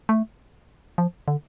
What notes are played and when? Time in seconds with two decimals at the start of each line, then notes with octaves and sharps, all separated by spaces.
0.09 A3
0.98 F3
1.28 D3